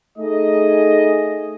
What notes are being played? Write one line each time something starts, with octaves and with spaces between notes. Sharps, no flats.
A3 D#4 G#4 D#5